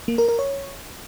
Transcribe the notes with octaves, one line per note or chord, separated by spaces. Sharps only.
A#3
A#4
A#4
C#5